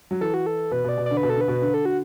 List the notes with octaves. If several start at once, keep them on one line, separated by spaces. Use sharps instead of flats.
F#3
E3 A4
F#4
A4
B2 B4
B2
D5
B2
D3 D5
B4
B2
A4
D3 B4
B2
D3
A4
F#4